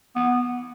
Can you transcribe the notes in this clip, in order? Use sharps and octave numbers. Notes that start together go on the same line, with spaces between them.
B3